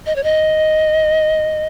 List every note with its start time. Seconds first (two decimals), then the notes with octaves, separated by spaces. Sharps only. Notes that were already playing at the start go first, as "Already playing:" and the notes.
0.06 D#5
0.16 C#5
0.24 D#5